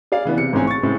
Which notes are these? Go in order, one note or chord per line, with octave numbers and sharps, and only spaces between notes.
G#4 D5 F5
C#3 E3 B3
C3 C#7
A1 G#2 C4 G#5
C#6 A6
A2 C#3 G#3 C4